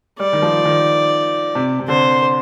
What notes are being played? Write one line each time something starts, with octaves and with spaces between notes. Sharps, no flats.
G3 D5
D#3
F3
D#3
C3
C3
D3 C5